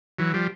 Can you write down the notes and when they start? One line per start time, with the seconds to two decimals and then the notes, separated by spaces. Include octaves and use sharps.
0.19 E3 F#3
0.34 F3 G3